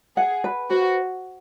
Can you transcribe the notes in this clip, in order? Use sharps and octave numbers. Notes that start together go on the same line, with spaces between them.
G#4 F#5
B4
F#4 C5